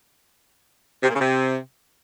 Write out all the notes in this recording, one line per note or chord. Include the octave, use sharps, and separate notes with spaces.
C3
A#2
C#3
C3